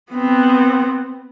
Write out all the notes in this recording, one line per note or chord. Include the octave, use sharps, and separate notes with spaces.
B3 C4